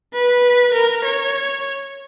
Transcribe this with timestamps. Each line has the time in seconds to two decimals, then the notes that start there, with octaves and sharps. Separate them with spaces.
0.14 B4
0.74 A#4
1.05 C#5